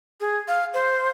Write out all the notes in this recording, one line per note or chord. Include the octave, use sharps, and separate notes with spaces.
G#4
F5
C5